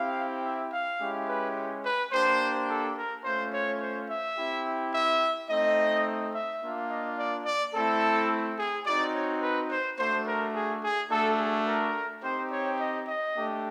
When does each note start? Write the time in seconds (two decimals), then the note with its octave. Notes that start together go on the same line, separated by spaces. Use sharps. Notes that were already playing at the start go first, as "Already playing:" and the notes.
Already playing: C4 E4 G4 F5
0.44 E5
0.72 F5
1.00 G#3 C#4 E4 G4
1.28 B4
1.84 B4
2.12 A#3 D4 G4 C5
2.68 A4
2.96 A#4
3.24 A3 C#4 F4 C5
3.53 C#5
3.80 C5
4.09 E5
4.37 C4 E4 G4
4.93 E5
5.49 A3 C4 D#4 D#5
6.33 E5
6.61 A#3 D4 F4
6.89 D#5
7.18 D5
7.45 D5
7.73 A3 C4 E4 A4
8.58 G#4
8.86 C4 D#4 F#4 D5
9.14 C#5
9.42 B4
9.70 C5
9.98 A3 D4 F#4 C5
10.26 A#4
10.55 G#4
10.83 G#4
11.10 A3 D4 F#4 A4
11.39 G#4
11.67 A#4
12.23 C4 D#4 G4 C5
12.51 C#5
12.79 D#5
13.07 D#5
13.35 A3 D4 G4